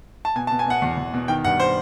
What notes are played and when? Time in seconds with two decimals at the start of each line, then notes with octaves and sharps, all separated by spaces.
0.25 A5
0.36 B2 G#5
0.47 A5
0.51 B2
0.59 G#5
0.66 B2 F#5
0.82 E2
0.98 E2
1.14 B2
1.28 D#3 G5
1.44 G2 F#5
1.60 C5